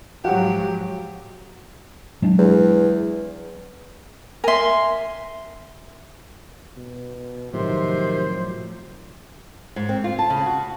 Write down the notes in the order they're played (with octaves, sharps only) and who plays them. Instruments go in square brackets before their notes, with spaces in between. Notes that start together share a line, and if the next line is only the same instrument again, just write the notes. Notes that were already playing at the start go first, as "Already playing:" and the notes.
[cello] G#2 F3 [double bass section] F#3 [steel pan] F#4 F5 F#5 [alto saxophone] G4
[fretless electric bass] F#3 G#3 D4
[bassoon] E2
[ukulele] A#4 E5 [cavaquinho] G#5 C6
[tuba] B2
[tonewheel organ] A2 F3 F#3 [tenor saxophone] C3 [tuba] D#3 [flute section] C5
[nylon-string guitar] G#2
C4
F4
A5
C#3
F#4